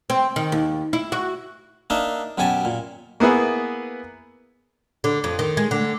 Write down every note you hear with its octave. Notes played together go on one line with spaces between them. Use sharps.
C4
D#3
D#2
E4
F#4
A#3 D4 D#4 E5
F#2 B2 G4 G#5 A5
A#2
A#3 B3 E4 G#4 B4
D3
F2
D#3
G#3
D3